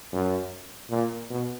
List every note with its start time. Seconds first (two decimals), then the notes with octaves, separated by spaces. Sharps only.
0.12 F#2
0.90 A#2
1.30 B2